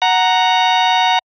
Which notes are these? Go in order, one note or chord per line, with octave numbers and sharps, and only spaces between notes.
F#5 A#5